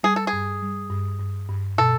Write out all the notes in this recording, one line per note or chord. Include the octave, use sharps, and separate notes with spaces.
G3 G#4
A4
G#4
G2
G3
G2
G2
G2
B2 A4